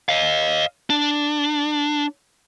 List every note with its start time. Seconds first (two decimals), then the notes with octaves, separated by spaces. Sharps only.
0.09 D#5 F5
0.90 D4